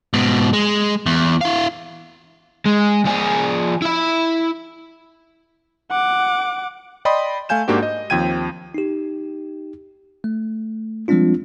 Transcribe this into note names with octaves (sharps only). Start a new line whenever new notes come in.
G#2 B2
G#3
E2
E4 F5
G#3
F3 G#4
E4 E5
F#5 D6
D5 D#5 G5 B5 C6 D#6
A3 F5 G#5 G6 E7
G#2 A#3 D4 F#4 G4
D#5
D#2 F3 C4 G5 G#6 D#7
D#4 G4
A3
F3 G3 G#3 C4 D4 F4